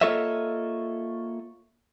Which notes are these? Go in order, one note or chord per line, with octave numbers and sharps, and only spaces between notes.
A#3 F4 A4 C#5 D#5 E5